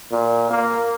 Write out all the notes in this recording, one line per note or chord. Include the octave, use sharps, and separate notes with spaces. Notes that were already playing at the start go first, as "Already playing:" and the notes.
A#2
A#3